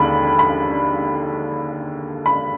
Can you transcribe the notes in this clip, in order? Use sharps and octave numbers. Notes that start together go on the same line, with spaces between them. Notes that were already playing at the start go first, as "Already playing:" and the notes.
Already playing: D#2 D3 G#3 B5
B5
B5